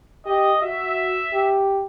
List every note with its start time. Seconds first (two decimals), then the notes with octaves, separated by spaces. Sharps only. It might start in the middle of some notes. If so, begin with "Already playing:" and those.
0.26 G4 D#5
0.62 F#4 E5
1.33 G4